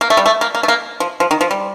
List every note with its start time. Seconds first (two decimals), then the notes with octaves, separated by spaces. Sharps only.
0.01 A#3
0.10 A3
0.17 G3
0.26 A3
0.41 A#3
0.55 A#3
0.63 A3
0.68 A#3
1.00 F3
1.20 F3
1.31 D#3
1.41 F3
1.51 G3